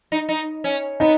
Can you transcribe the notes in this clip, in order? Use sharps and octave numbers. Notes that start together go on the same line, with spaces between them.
D#4
D#4
C#4
B3 D#4